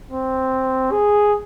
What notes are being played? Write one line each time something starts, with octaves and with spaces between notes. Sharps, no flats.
C4
G#4